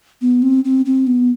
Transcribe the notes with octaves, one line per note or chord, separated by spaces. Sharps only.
B3
C4
C4
C4
B3